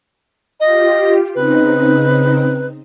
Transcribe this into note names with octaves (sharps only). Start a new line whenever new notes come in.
F4 G4 D#5
C#3 C4 D#4 B4